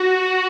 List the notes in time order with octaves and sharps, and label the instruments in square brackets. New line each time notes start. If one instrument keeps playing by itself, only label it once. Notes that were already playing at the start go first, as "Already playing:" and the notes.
Already playing: [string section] F#4